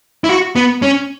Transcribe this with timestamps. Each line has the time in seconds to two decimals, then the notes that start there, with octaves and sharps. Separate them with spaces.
0.24 E4
0.29 F#4
0.56 B3
0.82 C#4